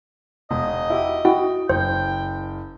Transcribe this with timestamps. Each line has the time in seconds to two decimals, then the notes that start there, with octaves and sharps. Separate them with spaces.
0.51 E1 D#5
0.90 E4 F#4 G4
1.25 E4 F#4 F#5 G5
1.69 F#1 C5 G5